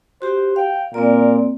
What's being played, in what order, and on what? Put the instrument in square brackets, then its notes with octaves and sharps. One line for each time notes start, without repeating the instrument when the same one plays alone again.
[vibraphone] F#4 G4 [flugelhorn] C5
[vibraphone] F5 [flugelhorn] G5
[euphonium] A#2 [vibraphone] A#3 C4 D5 [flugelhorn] A#4